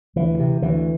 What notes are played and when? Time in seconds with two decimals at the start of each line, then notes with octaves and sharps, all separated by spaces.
0.16 D2 E3
0.39 C3
0.62 D2 E3